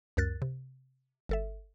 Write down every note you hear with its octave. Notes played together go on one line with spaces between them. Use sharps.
C#2 F#2 A#4 F#6 A6
C3
G1 A4 E5